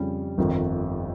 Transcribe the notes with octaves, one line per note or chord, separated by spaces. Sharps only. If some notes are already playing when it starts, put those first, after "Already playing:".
Already playing: F2 C#3 G3
G1 F2 D#3